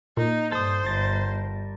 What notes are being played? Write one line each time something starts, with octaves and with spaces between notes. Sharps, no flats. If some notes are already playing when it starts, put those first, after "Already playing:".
A#2 D#4
G2 A4 C5 D#6
G1 G3 A#4 A5